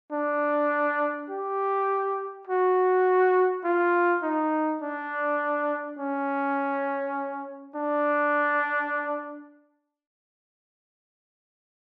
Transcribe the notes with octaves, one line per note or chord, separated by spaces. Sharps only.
D4
G4
F#4
F4
D#4
D4
C#4
D4